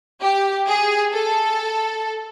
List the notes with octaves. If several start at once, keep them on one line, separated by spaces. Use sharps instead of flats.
G4
G#4
A4